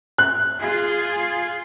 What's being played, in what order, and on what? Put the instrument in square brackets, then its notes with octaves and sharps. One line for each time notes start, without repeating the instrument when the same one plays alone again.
[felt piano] F#6
[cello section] F4 G#4